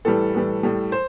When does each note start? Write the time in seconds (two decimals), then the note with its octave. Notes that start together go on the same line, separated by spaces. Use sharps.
0.05 A2 E3 G3 A4
0.35 A2 E3 G3
0.63 A2 G3
0.92 C5